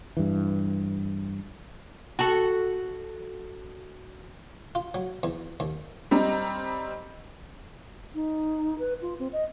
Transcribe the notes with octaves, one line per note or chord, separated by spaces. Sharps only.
G2 E3
F#4 A4
F4
F#3
E2
D#2
G3 C4 D#4 A#5
D#4
B4
F4
C4
D#5